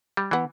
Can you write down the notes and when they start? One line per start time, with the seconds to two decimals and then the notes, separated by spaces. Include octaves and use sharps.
0.17 G3
0.31 E3 B3